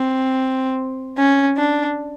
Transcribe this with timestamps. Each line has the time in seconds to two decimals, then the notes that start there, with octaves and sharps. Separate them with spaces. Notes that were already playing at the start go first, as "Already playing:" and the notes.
Already playing: C4
1.18 C#4
1.57 D4